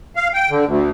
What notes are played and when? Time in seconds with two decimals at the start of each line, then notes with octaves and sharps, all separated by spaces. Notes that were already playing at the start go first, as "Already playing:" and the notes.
0.16 F5
0.34 G5
0.50 D3
0.66 D2